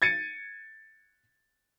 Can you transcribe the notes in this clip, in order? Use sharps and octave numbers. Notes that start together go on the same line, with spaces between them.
G#6 A6 C#7 D#7